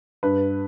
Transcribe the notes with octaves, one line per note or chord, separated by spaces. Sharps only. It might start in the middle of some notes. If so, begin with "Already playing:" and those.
G2 B4